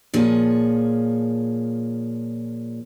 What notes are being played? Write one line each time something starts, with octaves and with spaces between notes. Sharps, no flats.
A#2 F3 G#4 C#5